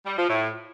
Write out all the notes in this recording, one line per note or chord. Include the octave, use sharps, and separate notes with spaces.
G3
F3
A2